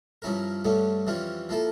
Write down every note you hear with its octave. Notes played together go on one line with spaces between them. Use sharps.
G2 F3 C#4 E4 A#4
G2 D3 A3 C#4
F2 E3 G3 C#4 F4
F3 A#3 E4 A4